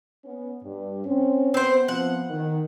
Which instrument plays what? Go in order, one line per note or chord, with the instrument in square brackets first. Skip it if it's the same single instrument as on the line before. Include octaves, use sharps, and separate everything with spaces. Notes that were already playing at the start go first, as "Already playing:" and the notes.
[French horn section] B3 C#4
G2
C4 C#4
[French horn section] B3 [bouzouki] C4 C5
[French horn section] F3 B3 C4 [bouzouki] F#5
[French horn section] D#3